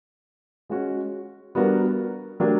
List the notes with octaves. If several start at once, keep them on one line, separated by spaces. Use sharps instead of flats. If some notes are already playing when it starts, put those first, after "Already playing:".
G#3 C#4 F#4
G3 B3 D4 F#4 A#4
F#3 A3 D4 G4 A#4